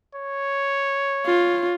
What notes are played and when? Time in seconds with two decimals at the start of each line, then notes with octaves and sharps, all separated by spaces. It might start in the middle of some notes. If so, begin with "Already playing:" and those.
0.15 C#5
1.26 F4